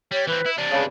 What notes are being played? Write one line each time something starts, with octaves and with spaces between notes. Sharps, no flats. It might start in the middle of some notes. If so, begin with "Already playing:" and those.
G3 C#5
E3 C4 B4
E4
C3 D4 D5
G2 C#3